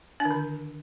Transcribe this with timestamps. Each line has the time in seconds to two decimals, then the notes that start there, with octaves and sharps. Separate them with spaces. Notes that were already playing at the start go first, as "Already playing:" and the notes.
0.20 D4
0.25 D#3
0.31 D3